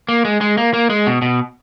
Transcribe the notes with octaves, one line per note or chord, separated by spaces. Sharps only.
A#3
G#3
G#3
A#3
A#3
G#3
B2
B2